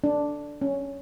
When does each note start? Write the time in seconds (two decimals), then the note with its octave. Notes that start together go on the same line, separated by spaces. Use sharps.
0.04 D4
0.61 C#4